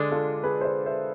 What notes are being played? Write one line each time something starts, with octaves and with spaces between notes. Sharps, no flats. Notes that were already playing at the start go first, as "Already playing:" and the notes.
Already playing: D3 G#3 D4 A4
F4 A4
G#4 B4
C5
B4 D5
C5 E5